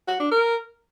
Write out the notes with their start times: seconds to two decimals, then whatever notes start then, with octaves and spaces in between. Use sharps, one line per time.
0.08 F#4
0.20 D4
0.32 A#4